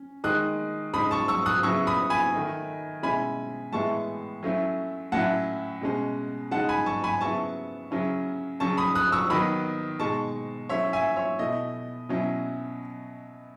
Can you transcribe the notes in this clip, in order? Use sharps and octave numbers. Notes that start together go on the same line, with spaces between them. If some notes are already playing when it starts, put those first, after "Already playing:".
Already playing: C#4
D#3 G#3 D#4 D#6 F#6
C#3 G#3 D#4 B5 D#6
A5 C#6
C#6 E6
D#6 F#6
C#3 F#3 B3 E4 C#6 E6
B5 D#6
G#5 B5
D#3 A3 D#4
B2 G#3 C#4 E4 G#5 B5
A2 E3 G#3 B3 E4 A5 C#6
F#3 A3 C#4 E4
A2 F#3 C#4 E4 F#5 A5
B2 G#3 C#4
C#3 G#3 D#4 F#5 A5
G#5 B5
A5 C#6
G#5 B5
C#3 F#3 B3 E4 A5 C#6
C#3 F#3 C#4 E4
C#3 F#3 C#4 A5 C#6
B5 D#6
D#6 F#6
C#6 E6
D#3 F#3 B3 B5 D#6
B2 G#3 D#4 A5 C#6
F#3 A3 C#4 E4 C#5 E5
E5 G#5
C#5 E5
B2 A3 E4 D#5
B2 F#3 C#4 E4